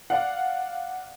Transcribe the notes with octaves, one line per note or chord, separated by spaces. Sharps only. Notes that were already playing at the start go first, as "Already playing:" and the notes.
D5 F5 F#5